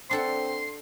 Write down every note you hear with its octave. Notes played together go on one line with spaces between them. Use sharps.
C4 D4 A4 F#5 C6